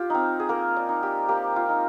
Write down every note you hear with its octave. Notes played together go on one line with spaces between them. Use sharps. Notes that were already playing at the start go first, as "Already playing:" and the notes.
Already playing: F4 G4
C4 D#4
G#4
A#3 A#4
D5
D#4
G4
A#3 G4
F4
D#4